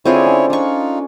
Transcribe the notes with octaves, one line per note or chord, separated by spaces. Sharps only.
D3 C4 E4 F4 G#4 C#5
C#4
D4 D#4 F4 C#6